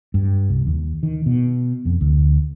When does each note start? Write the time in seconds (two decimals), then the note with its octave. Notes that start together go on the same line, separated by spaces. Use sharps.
0.14 G2
0.49 C2
0.67 D#2
1.03 D#3
1.26 B2
1.85 F2
2.01 D2